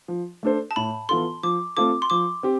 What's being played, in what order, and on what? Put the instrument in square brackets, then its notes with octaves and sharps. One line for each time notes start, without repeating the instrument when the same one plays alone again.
[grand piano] F3
A3 D4 A4 C5
[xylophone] A5
[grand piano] A2 [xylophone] B5
[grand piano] E3 B3 F4 A4 [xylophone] C6
[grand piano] F3 [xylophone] D6
[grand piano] A3 C4 F4 A4 [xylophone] D6
[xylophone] C6
[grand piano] F3 [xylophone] D6
[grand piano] C4 G4